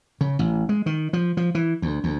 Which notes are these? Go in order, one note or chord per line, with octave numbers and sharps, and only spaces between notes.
C#3
A1
G#3
D#3
F3
F3
E3
D2
D2